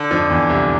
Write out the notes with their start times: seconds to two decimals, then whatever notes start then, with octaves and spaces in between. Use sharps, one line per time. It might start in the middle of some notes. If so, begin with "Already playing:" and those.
Already playing: D3
0.11 F2 F3
0.30 E2 E3
0.49 C2 C3